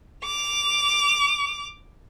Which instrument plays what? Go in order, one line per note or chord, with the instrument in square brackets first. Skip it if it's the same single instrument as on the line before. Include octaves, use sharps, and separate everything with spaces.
[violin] D6 F7